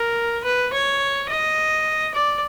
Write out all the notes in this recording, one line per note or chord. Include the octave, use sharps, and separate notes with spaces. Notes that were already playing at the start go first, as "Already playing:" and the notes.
Already playing: A#4
B4
C#5
D#5
D5